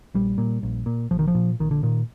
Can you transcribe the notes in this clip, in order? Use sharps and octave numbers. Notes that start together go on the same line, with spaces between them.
A#1 G3
A#2
A#1
A#2
A#1 F3
D#3
F3
A#2
A#1 D#3
D3
A#2 D#3